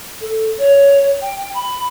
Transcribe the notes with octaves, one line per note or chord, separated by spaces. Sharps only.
A4
C#5
G5
B5